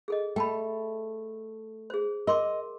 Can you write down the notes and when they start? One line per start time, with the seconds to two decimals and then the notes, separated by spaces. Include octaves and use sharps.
0.08 G#4 A4 D#5
0.36 A3 G5 A5 B5
1.90 G#4 C5
2.27 A#4 D#5 C6 D6